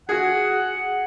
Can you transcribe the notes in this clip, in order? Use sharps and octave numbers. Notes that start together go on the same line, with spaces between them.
F#4 G#4 F#5